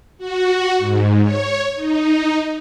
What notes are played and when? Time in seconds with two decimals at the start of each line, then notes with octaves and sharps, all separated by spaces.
0.18 F#4
0.79 G#2
1.22 C#5
1.76 D#4